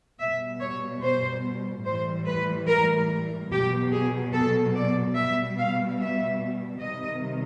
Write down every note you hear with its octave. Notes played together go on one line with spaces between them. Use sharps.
B2 G3 E5
C#5
C5
A2 E3 G3 C5
B4
A#4
B2 F#3 G4
G#4
A4
D5
B2 G3 E5
F5
E5
C3 D#3 G3 D#5